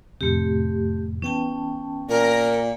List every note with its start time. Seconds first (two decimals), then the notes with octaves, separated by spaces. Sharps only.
0.21 F2 A2 C3 A3 G4
1.22 E3 B3 C#4 G5 A5
2.09 A#2 A#4